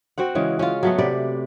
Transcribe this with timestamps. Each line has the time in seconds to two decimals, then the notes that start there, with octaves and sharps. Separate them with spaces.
0.18 C4 F#4 C5 F#5
0.35 C#3 E3 G#3 C#4
0.59 C#4 F4
0.83 F#3 A3 B3
0.98 C3 B4 D5